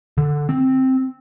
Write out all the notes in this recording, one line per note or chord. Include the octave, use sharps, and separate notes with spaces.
D3
C4